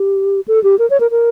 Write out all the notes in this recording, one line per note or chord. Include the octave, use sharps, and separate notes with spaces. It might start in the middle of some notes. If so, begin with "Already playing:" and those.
Already playing: G4
A4
G4
A#4
C#5
A#4
A#4